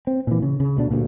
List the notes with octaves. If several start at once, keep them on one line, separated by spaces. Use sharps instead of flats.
C4
A#2 E3
C#3
C#3
D2 B2 D4
D2 G2 A#2